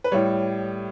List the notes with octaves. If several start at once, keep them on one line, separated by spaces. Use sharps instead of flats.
B4
A2 G3 C#5